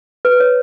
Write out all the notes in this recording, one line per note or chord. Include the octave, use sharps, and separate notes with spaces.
B4
C#5